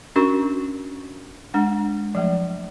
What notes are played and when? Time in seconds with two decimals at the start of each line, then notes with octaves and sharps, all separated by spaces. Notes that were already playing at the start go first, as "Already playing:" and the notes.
0.16 C#4 D4 F#4 A#4 C6 C#6
1.54 G#3 D4 F#5
2.15 F3 F#3 A3